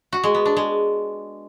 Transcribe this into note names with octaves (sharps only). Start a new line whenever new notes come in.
F#4
G#3
B3
D4
G#3